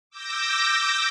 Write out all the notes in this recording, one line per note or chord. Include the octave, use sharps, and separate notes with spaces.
D6 E6 G6 A#6